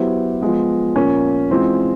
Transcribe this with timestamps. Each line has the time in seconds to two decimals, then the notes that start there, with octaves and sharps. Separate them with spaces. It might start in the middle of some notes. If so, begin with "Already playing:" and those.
Already playing: F#3 B3 E4 G4 C5
0.41 F3 G#3 B3
0.96 A#2 F3 A#3 C#4
1.50 E3 G#3 C4 F4